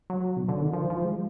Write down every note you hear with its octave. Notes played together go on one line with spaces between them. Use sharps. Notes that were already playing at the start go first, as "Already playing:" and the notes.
F#3
B2
D3
D#3
F3
F3
G#3